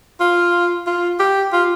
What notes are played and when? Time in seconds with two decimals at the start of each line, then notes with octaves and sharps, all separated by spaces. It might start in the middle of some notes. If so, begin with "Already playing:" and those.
0.20 F4
0.87 F4
1.20 G4
1.53 F4